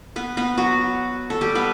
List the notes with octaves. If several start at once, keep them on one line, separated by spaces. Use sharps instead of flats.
B3 B4
B3 B4
F#3 F#4
A4
G3 G4
B3 B4